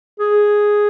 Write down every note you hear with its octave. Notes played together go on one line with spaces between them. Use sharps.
G#4